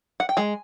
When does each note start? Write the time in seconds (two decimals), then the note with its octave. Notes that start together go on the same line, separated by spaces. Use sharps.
0.20 F#5
0.29 G5
0.37 G#3 G#5